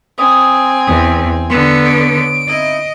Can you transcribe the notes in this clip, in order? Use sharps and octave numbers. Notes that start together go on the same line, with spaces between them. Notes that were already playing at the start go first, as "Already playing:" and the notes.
C4 D#5 G#5 D#6
E2 D#6
D3 B3 C6
C#5 D#5 D7
C4 D#4 E4 D#5